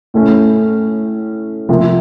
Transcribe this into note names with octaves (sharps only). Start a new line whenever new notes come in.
A2 A3 C#4
C3 F3 A#3